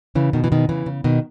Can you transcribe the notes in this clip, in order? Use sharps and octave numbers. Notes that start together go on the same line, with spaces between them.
C#3 E3
B2 D#3
E3
B2 D#3
C#3 E3
C#3
B2 D#3